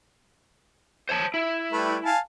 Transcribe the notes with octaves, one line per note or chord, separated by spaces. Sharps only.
C5 C#5 A5
E4
G3 A3 B4
F5 G#5 A5